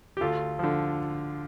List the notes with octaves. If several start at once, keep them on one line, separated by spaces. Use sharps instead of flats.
G4
D2 F4 A4
D3 F3